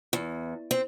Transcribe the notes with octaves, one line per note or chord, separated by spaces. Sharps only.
E2
C4